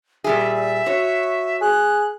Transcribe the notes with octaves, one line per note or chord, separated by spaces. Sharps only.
A#2 G3 G#4 E5
F#4 C#5
G#4 F#6